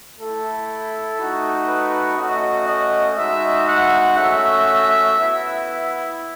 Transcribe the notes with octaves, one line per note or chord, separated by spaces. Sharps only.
A3 E4 A4
A3 D#4 F#4
B4
A3 C#4 F#4 D#5
D#5
G#3 D#4 F#4 E5
F#5
A3 C#4 F#4 E5
B3 E4